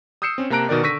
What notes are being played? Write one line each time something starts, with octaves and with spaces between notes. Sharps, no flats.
D#6 E6 G6 C7 C#7 E7
C4 C#4
C3 A#3 A5 A#5 F#6 D7
B2 D#3 A#4 D5 F#6
D3 C#6 E6 A#6 B6 D#7